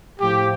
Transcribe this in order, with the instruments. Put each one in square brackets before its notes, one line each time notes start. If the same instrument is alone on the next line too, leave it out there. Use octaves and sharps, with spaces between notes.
[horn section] A2 F3 G4